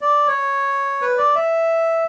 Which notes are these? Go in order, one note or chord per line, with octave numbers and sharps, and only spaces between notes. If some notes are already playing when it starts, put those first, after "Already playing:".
D5
C#5
B4
D5
E5